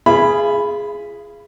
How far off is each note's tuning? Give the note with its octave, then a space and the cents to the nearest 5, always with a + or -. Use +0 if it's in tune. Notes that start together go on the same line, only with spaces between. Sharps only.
F4 -30 G#4 +0 B5 +0